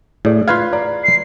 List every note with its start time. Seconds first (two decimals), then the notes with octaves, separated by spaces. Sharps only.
0.25 A2 G#4 D5
0.48 F4 B4 F5 G#6 C7
0.73 D5 A#5
1.04 C7